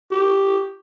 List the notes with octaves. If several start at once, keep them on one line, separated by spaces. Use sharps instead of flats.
G4